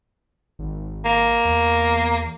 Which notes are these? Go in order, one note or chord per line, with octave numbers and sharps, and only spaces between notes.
G#1
A#3
E2